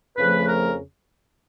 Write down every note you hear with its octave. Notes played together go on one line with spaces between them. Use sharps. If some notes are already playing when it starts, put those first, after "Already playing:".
F2 C#3 F3 A3 B4
A#4